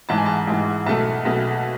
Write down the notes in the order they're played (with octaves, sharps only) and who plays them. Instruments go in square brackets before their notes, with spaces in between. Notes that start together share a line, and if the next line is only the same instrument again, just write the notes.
[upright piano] A1 G#2 E3 A5
G#5
A5
A1 G#2 E3
B1 B2 A3 A5
B1 B2 A3